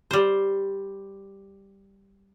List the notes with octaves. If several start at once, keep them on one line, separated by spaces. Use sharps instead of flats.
G3 C5